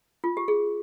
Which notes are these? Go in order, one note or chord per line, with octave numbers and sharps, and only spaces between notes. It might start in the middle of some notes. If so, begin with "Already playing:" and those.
F4
G4
G#4